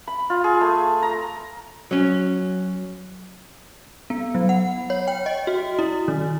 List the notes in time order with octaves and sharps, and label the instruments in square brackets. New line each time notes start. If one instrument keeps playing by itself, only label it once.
[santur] B5
F4
G#4
A3
A#5
[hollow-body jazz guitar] F#3 C#4
[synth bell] B3
F#3
F#5
C#5
G5
D#5
F#4
E4
D#3